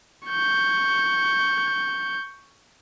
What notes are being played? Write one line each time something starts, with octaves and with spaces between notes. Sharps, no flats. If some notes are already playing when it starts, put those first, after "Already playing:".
C#6 G6